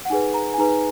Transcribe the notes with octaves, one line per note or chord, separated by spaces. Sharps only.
F#5
D#4 G#4 B4 G#5
A#5
G#5
D#4 G#4 B4 A#5